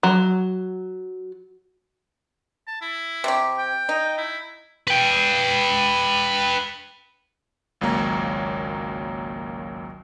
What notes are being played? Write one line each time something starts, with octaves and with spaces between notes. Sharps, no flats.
F#3
A5
E4
C3 G4
G5
D#4
E4
B4 G5
G#1 C#2 F#3 A#3 C#5 A#5